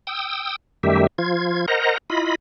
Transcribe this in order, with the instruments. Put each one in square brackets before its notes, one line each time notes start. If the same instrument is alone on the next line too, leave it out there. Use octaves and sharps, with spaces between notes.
[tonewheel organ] G5 D#6 E6
F#2 D#3 G3 A3 G4 E5
F3 F4 G#6
A#4 C5 D#5 F#5 A#5
E4 F4 D#5 B5